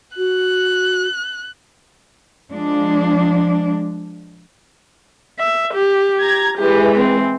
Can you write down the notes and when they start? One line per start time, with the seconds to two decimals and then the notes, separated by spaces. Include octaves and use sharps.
0.17 F#4 F#6
2.50 F3 G#3 D4
5.39 E5
5.74 G4
6.20 A#5 G#6
6.58 E3 G#3 G4
6.96 C4